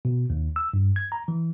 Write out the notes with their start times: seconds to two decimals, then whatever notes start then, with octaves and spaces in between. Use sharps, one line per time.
0.05 B2
0.30 D#2
0.56 E6
0.74 G2
0.96 G#6
1.12 A#5
1.28 E3